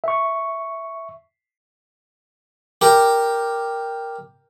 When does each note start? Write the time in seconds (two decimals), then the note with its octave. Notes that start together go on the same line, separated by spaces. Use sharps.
0.04 E5 C#6
2.81 G4 A#4